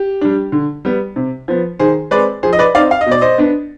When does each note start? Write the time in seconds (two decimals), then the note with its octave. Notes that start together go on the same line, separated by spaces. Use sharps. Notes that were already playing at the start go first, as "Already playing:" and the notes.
Already playing: G4
0.21 G3 D4
0.52 D3
0.85 G3 B3
1.16 C3
1.48 F3 B3
1.79 D#3 G#4 C5
2.11 G#3 C4 B4 D5
2.43 F3 G#4 C5
2.53 D#5
2.59 B4 D5
2.75 C4 D#4 D5 F5
2.91 F5
3.01 D#5
3.06 B2
3.11 D5
3.21 C5 D#5
3.38 B3 D4